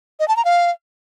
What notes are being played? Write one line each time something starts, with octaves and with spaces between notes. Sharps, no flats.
D#5
A5
A#5
F5